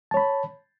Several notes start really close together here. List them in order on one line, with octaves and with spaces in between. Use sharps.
A5 C#5 B5